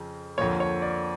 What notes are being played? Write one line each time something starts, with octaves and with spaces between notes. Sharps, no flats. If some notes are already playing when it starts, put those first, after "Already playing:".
Already playing: F2 C#3
F2 D3 F3 A#3 C#5
C#5
D5